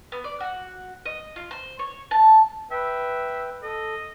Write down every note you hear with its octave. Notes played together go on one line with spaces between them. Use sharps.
B3
D5
F#4
D#5
F4
C5
C#5
A5
B4 E5 G5
A4 D#5